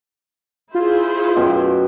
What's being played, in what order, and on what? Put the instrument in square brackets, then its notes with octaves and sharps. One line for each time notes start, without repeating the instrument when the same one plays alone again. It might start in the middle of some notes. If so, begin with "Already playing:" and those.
[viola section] E4 G#4 C5 [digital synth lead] F4
[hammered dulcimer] F#2 B2 G5